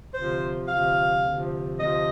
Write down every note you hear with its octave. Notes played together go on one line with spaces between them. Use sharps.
D2 C3 F3 C5
D2 C3 F3 F5
D2 C3 F3
D2 C3 F3 D#5